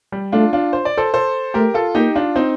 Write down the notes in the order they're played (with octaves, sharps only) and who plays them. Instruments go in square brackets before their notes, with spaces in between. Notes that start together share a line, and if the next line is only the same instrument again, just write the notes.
[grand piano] G3
[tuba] A3 [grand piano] D4 F4
[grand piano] D4 F4
C5
D5
A4 C5
A4 C5
[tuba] A3 [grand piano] G4 A#4
[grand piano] F4 A4
[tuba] A#3 [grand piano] D#4 G4
[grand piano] D4 F4
C4 D#4